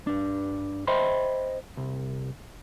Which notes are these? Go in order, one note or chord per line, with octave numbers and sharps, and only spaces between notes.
G2 D4
C5 D#5 E5 G5 B5 C6
C2